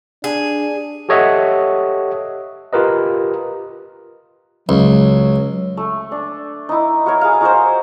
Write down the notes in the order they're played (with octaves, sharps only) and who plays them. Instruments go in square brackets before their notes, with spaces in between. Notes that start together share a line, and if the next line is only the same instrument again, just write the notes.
[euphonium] D4 [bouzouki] G#4
[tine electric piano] G4 A4 C#5 D#5 E5 F#5
F4 G4 A#4 B4 D#5
[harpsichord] C#2 [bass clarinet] F#3
[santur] A3
D4
D#4 E4
F#4 A#4 C#5
G#4 F5
D#4 F#4 A#4 C5